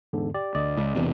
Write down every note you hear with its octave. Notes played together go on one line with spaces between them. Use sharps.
E2 G#2 D3
G4 D5
D2 D5 D#5
C#2
E1 E2 C3